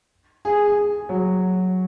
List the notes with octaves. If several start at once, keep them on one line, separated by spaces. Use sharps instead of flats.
G#4
G#4
F#3